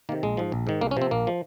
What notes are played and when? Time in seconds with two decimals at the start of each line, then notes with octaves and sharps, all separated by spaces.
0.09 D#3 A#3
0.12 C3
0.23 A#1 G#3
0.37 G#2 F3
0.52 A#1
0.67 G#2 D#3
0.81 C2 A#3
0.91 C#4
0.97 C3 F3 C4
1.11 A#1 A#3
1.27 F3